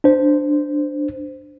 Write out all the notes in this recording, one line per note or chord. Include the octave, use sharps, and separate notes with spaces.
D4 C5